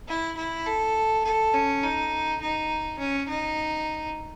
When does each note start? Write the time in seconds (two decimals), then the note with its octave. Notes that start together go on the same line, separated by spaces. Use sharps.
0.08 E4
0.37 E4
0.66 A4
1.24 A4
1.54 C#4
1.83 D#4
2.41 D#4
2.99 C#4
3.28 D#4